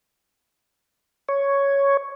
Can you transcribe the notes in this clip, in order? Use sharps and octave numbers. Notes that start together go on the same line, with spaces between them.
C#5